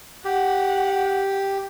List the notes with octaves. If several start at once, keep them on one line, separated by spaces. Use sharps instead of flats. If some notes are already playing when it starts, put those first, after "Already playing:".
G4 F#5